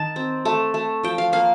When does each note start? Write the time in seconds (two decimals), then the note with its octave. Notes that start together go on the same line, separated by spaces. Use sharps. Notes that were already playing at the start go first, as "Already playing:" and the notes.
Already playing: D#3 A5
0.16 C4
0.45 A3
0.74 A3
1.03 F3 G5
1.18 F5
1.33 A#3 F5